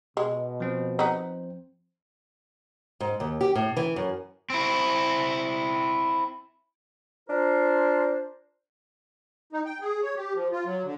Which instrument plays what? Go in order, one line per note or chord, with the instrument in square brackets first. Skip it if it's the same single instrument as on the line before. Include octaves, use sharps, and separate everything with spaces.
[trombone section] B2 [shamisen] G#3
[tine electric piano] F3 C4 C5
[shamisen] B3 D#4
[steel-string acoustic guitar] G#2
D#2
G4
A2
E3
F#2
[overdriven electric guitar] C4 E4
[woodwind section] D4 F4 A#4 C5
[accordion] D#4
G5
G#4
C#5
G4
F3
F4
F#3
D3